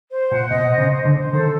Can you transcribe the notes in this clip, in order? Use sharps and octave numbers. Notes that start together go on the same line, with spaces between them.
C5
A#2 F#5
B2 D#5
C5
C#3
C5
D3
C5
D#3 A4